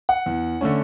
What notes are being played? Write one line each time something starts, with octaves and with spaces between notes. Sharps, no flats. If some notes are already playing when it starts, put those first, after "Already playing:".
F#5
E2
D3 A3 C#4